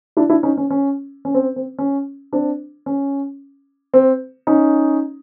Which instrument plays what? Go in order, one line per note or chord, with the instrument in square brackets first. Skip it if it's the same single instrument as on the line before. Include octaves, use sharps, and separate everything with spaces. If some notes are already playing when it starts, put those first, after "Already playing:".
[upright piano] D4 E4
D4 E4
C#4 D#4
C#4
C#4
C#4
C4
C4
C#4
C4 D4
C#4
C4
C#4 D#4